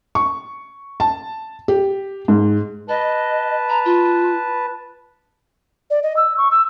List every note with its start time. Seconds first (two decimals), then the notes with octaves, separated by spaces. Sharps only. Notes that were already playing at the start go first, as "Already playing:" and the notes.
0.15 C#6
1.00 A5
1.68 G4
2.28 G#2
2.89 B4 D#5 A5
3.69 A#5
3.85 F4
5.90 D5
6.03 D#5
6.17 E6
6.38 C#6
6.51 E6